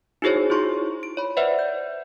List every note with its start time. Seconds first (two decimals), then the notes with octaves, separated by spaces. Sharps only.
0.22 D#4 E4 F#4 G#4 C5 C#5
0.50 E4 F4 C6 C#6
1.03 D7
1.17 C#5 B5
1.37 B4 C5 D5 E5 F#5
1.59 G6